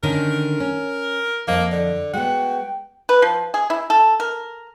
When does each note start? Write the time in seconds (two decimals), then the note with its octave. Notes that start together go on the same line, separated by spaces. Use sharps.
0.03 D3 D#3 C#4 A#4
0.60 C#4
1.47 F2 A#3 D#5
1.72 D3
2.13 G#3 B3 F#4 G5
3.09 B4
3.22 F3
3.54 G#4
3.70 E4
3.90 A4
4.20 A#4